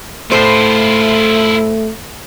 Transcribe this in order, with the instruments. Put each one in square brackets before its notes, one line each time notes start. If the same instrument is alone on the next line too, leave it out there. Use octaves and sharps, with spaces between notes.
[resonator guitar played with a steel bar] A2 C5 [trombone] A3 [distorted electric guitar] E4 F4